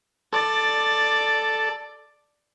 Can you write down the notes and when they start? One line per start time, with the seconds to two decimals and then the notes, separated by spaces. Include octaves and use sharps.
0.32 A4 D5